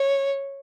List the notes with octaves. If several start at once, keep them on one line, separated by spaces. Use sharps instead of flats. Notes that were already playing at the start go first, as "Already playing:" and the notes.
Already playing: C#5